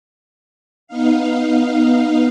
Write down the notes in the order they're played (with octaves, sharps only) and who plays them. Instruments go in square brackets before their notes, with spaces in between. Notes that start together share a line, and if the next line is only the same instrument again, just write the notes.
[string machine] B3 D#4 F5